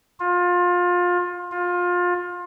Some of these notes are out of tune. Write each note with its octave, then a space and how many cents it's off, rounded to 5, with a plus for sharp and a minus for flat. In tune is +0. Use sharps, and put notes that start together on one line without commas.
F4 +25
F4 +25